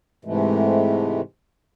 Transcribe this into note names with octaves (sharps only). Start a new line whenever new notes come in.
G#2 C3 E3 G#3 A3